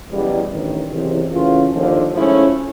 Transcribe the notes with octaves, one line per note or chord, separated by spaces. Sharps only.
F#1 E2 B2 G3
A1 G2 D#3
F#1 E2 C3 E3
C#3 E3 A3 C#4 F4
D#2 D3 F3
G#2 F3 A3 C#4 E4